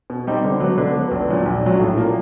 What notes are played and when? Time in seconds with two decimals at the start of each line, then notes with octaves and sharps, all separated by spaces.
0.10 B2
0.27 G3 C4 D#4 G4
0.44 D3
0.60 F#3 B3
0.78 D3
0.95 F#3 B3
1.11 A#1
1.28 A#2 F#3
1.46 A#1
1.63 A#2 F#3
1.80 A2
1.96 F3 A#3